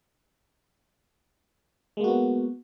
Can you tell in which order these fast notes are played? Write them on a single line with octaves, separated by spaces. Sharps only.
G#3 A#3 F#4 B3